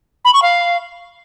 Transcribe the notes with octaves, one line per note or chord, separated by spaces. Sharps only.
B5
C#6
F5